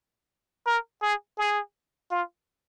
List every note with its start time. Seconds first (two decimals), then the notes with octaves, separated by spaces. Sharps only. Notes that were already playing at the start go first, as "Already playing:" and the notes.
0.67 A#4
1.02 G#4
1.38 G#4
2.11 F4